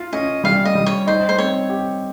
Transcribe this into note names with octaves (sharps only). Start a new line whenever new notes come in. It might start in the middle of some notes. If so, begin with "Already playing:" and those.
Already playing: F4
C#4 D#5
G3 F5
D#5
G3
C#5
D#4 C5
C5
C4 C#5
G4